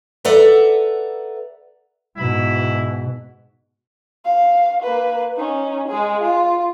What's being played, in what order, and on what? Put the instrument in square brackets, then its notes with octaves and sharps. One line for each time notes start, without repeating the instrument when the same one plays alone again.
[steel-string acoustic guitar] A4 B4 D5 E5 F#5 A#5
[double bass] G#2 B2 [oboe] E4
[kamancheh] F5
A#3 B4
C#4 D#4
G#3 G#4
F4